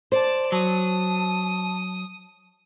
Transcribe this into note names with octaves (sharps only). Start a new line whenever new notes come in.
C5 D5 A5
F#3 A5 D#6